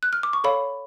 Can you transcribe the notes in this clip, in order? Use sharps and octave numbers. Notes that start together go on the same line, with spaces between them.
F#6
F6
D6
C#6
A4 C#5 F5 B5